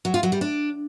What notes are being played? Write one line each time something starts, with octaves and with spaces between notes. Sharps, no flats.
F#3
F4
F#3
G3
D4